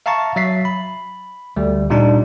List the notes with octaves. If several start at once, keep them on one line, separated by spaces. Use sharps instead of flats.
E5 F5 A5 A#5 C#6 A6
F#3 E5 A6 B6 C7
B5
D2 G3
A#2 G3 D4 D#4